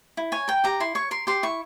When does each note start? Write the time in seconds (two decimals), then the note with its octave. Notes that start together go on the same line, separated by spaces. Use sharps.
0.17 E4
0.32 C#5 G#5
0.48 A#4 G5
0.64 G4 A#5
0.80 E4 C6
0.95 C#5 C#6
1.11 A#4 C6
1.27 G4 C6
1.43 E4 C#6